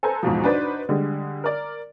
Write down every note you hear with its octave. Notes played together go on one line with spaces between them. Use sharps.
A4 B4 C5 G#5 A#5
E2 G#2 B2 F3
D4 D#4 F#4 B4 C5 D5
D3 G3 G#3
A#4 D5